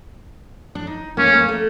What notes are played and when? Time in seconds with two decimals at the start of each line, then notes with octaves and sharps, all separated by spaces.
0.75 D4
0.87 D#4
1.17 A#3 C#4
1.33 A#3
1.49 A3